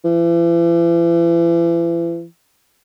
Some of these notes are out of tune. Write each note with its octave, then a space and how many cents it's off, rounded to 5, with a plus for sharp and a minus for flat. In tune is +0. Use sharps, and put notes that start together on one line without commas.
E3 +40